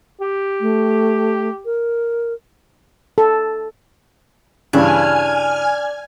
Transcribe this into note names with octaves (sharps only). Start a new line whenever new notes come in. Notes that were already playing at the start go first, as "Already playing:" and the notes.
G4
A3
A#4
A4
G2 C#3 E3 D4 G#5 F6 G#6